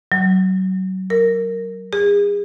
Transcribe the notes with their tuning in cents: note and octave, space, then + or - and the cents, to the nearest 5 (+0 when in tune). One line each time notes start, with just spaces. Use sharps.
F#3 +25
A#4 -10
G#4 -35